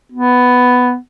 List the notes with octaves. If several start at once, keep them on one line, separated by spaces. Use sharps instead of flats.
B3